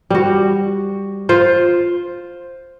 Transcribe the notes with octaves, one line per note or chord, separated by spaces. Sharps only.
G3 F#4
F4 C5